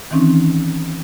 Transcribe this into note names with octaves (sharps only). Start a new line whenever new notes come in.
D#3 E3 C4 C#4 D#4